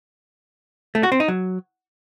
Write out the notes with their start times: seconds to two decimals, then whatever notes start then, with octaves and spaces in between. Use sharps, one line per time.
0.95 A3
1.03 F#4
1.12 C4
1.20 D#4
1.28 F#3